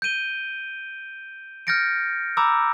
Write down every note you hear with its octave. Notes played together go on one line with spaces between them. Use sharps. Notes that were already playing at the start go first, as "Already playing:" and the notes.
G6 D7 D#7 G7
F6 G6 A6 A#6 C#7 D7
A#5 B5 D6 E6